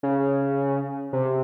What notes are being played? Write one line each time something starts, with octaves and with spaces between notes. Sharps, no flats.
C#3
C3